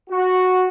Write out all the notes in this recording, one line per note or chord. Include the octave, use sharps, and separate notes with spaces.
F#4